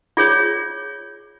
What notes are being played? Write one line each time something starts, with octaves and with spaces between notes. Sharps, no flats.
F4 G#4 C#5 D5